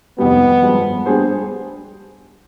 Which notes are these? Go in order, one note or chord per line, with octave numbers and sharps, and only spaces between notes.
F2 C3 D#3 G3 B3
G2 F3 G#3
G3 B3 D4 G#4 C5